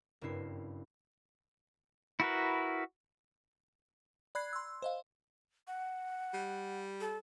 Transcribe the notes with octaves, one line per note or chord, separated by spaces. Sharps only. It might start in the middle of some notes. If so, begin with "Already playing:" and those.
F#1 G2 C4 E4 C7
E4 F#4 A#4 B4
D5 B5 F#6 G#6 C7
C6 E6
C5 D#5 F5
F#5
G3
A4